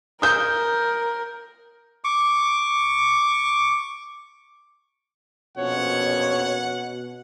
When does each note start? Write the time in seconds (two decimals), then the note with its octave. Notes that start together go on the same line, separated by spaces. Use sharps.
0.22 A#4 D#6 G6
2.04 C#6 D6
5.58 A#1 F2 B2 C#4 C#5 F#5